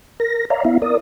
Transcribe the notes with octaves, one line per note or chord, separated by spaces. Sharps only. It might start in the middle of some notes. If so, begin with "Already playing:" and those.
A#4 A#6
C#5 D5 E5 F5 A#5
B3 E4 E5 F5
A#4 D5 D#6